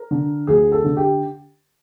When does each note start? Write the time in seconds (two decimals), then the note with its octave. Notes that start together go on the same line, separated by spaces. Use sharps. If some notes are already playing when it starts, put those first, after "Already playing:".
Already playing: A#4
0.11 D3
0.47 D2 G#4
0.72 A4
0.84 D3
0.97 G4